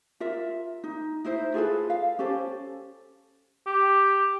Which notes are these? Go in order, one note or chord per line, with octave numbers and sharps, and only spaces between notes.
F4 A#4 E5
D#4
D#4 E4 C5 E5
F4 G#4 A4 B4
F5
C#4 G4 A4 C5
G4